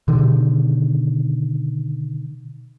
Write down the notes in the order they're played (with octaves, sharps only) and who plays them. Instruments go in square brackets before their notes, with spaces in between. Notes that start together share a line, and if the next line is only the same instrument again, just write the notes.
[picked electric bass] B2 D3 D#3